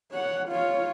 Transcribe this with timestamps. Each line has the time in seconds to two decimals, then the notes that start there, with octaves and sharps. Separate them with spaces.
0.12 C#5 F#5
0.49 F4 C#5